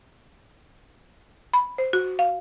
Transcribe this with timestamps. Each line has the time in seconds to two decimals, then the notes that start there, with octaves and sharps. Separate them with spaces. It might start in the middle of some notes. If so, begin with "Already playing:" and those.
1.53 B5
1.78 C5
1.93 F#4
2.19 F5